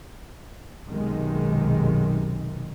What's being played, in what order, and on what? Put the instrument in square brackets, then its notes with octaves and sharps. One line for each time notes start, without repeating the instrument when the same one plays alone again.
[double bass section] B1 F#2 C3 D#3 G#3